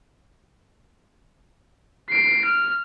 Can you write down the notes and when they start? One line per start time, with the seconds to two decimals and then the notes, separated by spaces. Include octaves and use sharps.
2.09 C7 D7
2.45 F6